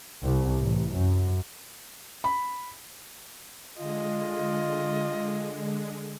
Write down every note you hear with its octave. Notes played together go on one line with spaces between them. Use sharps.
C2
A1
F#2
B5
D3 G#3 F4 D#5